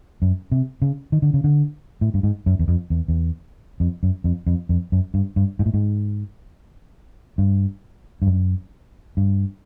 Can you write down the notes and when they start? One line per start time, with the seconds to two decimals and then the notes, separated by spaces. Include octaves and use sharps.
0.22 F#2
0.52 C3
0.82 C#3
1.12 D#3
1.22 D3
1.34 C#3
1.44 D3
2.01 A2
2.14 G2
2.23 G#2
2.46 F#2
2.59 E2
2.68 F2
2.90 E2
3.08 E2
3.80 F2
4.03 F#2
4.24 F2
4.46 F2
4.69 F2
4.92 F#2
5.14 G2
5.36 G2
5.59 G#2
5.66 A2
5.74 G#2
7.38 G2
8.22 G2
8.27 F#2
9.17 G2